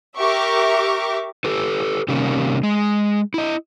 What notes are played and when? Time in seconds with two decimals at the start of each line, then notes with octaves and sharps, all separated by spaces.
0.17 G4 A#4 E5 C#6 D6
1.44 G4 A4 B4
2.08 C3 D#3 G3 A#3 C#4
2.63 G#3
3.34 E4 D#5